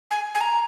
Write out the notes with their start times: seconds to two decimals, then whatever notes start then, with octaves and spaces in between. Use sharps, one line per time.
0.11 G#5
0.35 G#5
0.41 A#5